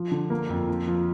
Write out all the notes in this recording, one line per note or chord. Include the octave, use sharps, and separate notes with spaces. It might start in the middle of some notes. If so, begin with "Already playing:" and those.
Already playing: F3
D3
A#3
F2
F3
F3